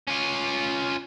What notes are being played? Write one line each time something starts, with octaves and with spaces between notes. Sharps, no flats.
C#4 F4